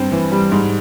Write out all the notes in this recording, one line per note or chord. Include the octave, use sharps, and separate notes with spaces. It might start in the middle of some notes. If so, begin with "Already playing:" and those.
Already playing: G2 C4
E3
G3
G#2